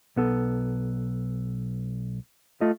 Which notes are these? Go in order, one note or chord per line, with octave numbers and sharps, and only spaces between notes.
B1 B3 A4
A3 F4 D#5